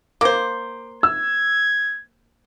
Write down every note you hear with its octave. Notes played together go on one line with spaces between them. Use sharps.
A#3 C5 D6
E6 G#6